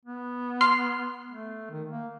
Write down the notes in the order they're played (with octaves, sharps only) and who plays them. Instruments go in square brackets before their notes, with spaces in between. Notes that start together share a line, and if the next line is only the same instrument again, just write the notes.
[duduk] B3
[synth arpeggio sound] C6 F6 C7
[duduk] A3
D#3
A#3